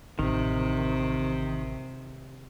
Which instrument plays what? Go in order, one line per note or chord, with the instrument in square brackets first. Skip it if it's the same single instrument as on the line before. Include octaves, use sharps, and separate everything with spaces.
[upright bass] A1 [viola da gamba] C3 [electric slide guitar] D#3